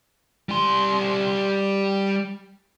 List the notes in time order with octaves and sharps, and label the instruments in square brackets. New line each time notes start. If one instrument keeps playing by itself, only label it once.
[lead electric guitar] G3 C6